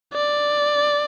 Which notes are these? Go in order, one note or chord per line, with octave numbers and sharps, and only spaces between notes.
D5